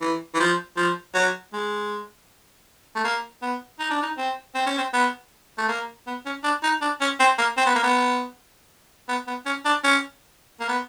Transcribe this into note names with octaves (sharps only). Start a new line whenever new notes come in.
E3
E3
F3
F3
F#3
G#3
A3
A#3
B3
D#4
D4
D#4
C4
C4
C#4
C4
B3
A3
A#3
B3
C#4
D4
D#4
D4
C#4
C4
A#3
C4
B3
A#3
B3
B3
B3
C#4
D4
C#4
A#3
B3